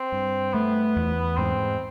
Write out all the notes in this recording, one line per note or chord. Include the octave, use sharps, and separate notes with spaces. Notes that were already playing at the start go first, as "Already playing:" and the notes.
Already playing: C4
G2
A3 B3
E2
G#2 C4